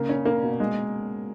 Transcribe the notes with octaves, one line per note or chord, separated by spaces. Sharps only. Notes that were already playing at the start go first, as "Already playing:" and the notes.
Already playing: C#3 A#3
C#4
A#3
B2
G#3